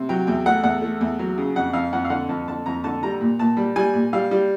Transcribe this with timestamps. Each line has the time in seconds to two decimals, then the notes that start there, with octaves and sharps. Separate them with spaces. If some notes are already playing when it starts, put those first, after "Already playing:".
Already playing: C3
0.09 F#3 G5
0.27 E2 G5
0.46 A3 F#5
0.63 E2 F#5
0.82 A3
1.01 E2
1.19 F#3
1.38 C#3
1.56 F2 F#5
1.73 F2 F5
1.93 F2 F#5
2.05 F5
2.10 D3 F#5
2.29 F2 A5
2.48 D3 A5
2.66 F2 A#5
2.84 D3 A5
3.03 G3 A#5
3.21 A#2
3.39 A#2 A5
3.57 G3
3.76 G3 G#5
3.93 A#2
4.13 G3 F5
4.31 G3